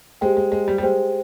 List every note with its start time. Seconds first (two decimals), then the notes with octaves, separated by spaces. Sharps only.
0.21 G#3 G4 C5 G5
0.37 G#3
0.52 G#3
0.68 G3
0.78 G3
0.83 G#3 G4 C5 G5